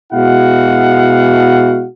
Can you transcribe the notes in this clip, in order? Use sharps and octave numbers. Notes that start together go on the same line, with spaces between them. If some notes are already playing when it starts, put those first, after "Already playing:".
B2 G#3 E4 F#4 F5 F#5